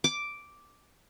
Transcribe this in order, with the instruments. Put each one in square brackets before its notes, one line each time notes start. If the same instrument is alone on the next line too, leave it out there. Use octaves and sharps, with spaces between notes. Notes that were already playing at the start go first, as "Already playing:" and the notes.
[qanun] D6